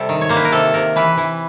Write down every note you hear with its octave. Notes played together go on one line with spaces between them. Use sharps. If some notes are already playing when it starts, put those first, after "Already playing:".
Already playing: C3 G3 A4
D#3
C#5
A#3 C5
B4
A#4
C3 A4
C3 A#4
E3 B4
E3